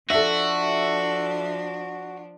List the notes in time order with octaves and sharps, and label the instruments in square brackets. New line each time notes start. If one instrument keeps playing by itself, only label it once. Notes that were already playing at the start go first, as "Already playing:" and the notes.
[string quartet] F3 D4 [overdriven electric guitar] F#4 [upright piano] A4 E5